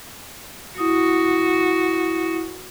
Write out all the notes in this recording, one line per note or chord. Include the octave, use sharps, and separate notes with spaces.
E4 F#4 D#6